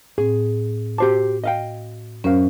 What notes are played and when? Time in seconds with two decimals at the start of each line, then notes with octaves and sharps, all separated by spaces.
0.18 A2 C4 G#4
0.98 F#4 G4 C5 A5 D6
1.44 D#5 F5 G5
2.24 F#2 C#4 A#4 C5 F5